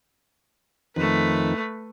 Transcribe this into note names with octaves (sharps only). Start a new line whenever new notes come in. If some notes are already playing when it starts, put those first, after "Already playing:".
F2 D#3 A3 B4